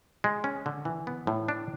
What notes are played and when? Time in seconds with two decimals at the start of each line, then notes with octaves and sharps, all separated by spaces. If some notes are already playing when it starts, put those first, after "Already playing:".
0.24 G#3
0.44 C#4
0.66 D3
0.85 E3
1.07 B3
1.27 A2
1.48 D4